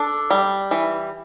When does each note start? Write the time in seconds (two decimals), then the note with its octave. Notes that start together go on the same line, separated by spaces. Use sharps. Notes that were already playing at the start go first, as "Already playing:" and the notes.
Already playing: D4 A4
0.30 G3
0.71 E3